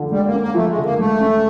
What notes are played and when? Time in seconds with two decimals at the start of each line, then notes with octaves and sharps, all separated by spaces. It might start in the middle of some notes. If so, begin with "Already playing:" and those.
Already playing: D3 F3
0.11 G3 G#3
0.26 A#3
0.33 C#4
0.40 A#3
0.55 F3 A3
0.69 G#3
0.78 D3
0.84 A#3
0.98 G#3 A3
1.20 C#4